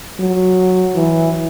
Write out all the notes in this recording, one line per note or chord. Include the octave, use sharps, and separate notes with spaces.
F#3
E3